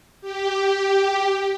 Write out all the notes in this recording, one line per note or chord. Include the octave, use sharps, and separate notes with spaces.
G4